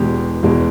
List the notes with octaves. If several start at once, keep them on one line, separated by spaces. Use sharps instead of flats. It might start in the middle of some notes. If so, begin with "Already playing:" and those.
Already playing: E1 E2 B2 G#3 G4
E1 E2 B2 G#3